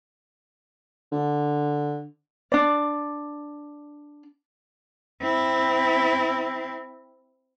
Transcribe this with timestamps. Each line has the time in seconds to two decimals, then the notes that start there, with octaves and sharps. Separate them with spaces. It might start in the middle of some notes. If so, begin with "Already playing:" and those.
1.12 D3
2.52 D4 D5
5.21 C4 E4